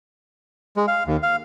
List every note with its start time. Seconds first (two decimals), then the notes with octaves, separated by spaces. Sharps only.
0.76 G#3
0.88 F5
1.07 D#2
1.23 F5